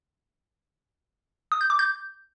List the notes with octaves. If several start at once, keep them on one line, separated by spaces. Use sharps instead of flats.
D#6
G6
D6
G6